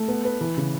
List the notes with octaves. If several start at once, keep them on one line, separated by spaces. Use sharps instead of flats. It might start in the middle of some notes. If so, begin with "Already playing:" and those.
Already playing: A3
B3
B4
E3
C#3